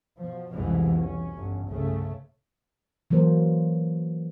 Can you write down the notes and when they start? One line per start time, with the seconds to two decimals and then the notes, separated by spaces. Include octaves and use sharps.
0.19 B2 F3
0.53 C2 F2 B2 E3 F3 G#3
0.99 C#4
1.37 G1
1.69 C2 G2 C#3 A3
3.11 E3 F#3 A#3 A#4 C5